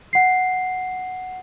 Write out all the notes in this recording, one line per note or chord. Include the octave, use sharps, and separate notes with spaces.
F#5 C7